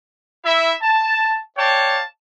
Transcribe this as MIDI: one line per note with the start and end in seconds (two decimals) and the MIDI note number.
0.45 0.72 64
0.45 0.72 76
0.82 1.38 81
1.57 2.02 73
1.57 2.02 74
1.57 2.02 77
1.57 2.02 79
1.57 2.02 81